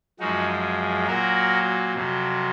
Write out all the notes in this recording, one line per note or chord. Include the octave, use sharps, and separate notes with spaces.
F#2 F3 G#3 D#4 F#4
A#2 F#3 F#4 A#4
F2 C3 F#3